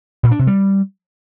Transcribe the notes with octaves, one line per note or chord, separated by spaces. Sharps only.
A#2
D4
C3
G3